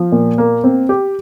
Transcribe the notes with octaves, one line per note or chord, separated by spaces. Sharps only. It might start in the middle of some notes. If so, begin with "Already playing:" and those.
Already playing: F3
A#2
A#3
C4
G4